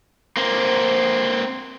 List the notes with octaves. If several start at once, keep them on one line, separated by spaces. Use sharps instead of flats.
A#3 C4